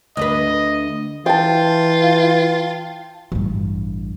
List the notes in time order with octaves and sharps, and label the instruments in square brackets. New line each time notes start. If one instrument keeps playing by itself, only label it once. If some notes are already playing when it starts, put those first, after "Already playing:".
[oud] D2 D4 B4 [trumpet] D#5
[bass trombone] E3 [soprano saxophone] F4 [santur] G5 A5
[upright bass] A1 G2